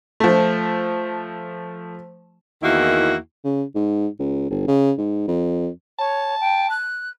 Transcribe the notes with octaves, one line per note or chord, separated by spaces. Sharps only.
F3 A3
E2 D#3 A#3 E4 F#4
C#3
G#2
C#2
G1
C#3
G#2
F2
C#5 A5
G5
F#6